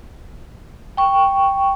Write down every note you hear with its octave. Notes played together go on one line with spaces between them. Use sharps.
G5 C#6